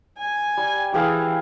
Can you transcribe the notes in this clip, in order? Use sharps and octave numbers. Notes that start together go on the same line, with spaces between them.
G#5
G3
E3 G4 G#4 F5